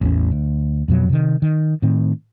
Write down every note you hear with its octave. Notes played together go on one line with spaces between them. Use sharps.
A1 E2 C#4
D2
F2 B2 F#3
C3 D#3
D#3
A2 D#3 C4